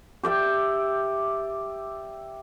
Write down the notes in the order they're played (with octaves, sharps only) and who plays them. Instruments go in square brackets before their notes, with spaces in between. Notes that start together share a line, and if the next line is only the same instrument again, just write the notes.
[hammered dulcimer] G4 D5 E5 G5